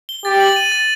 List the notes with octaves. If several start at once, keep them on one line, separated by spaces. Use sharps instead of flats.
G7
G4 A6
F#7
D#7
A6